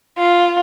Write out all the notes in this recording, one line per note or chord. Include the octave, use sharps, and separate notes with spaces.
F4